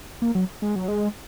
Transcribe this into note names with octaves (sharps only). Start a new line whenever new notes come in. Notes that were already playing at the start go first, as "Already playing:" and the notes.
A#3
F#3
G#3
F#3
G#3